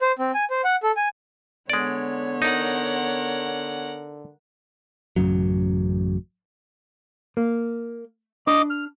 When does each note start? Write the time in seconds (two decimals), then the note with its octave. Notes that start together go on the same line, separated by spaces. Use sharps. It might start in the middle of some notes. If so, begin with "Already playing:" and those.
0.01 C5
0.19 C4
0.35 G#5
0.50 C5
0.64 F#5
0.83 A4
0.97 G#5
1.70 D3 G#3 B3 C#5 D5
2.42 D#4 A#4 F#5
5.16 A1 F#2 C#3 F#3
7.37 A#3
8.47 D4 D#5 B5 D6
8.70 F6